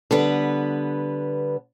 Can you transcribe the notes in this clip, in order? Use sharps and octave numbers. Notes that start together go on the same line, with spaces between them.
D3 G3 B3 B4